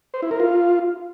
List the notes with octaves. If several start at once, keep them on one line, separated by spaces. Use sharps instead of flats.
C5
E4
A#4
F4